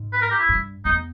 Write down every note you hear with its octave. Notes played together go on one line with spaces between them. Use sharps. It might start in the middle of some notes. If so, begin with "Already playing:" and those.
Already playing: G#2
B4
A#4
G4
E4
G2
E2 D#4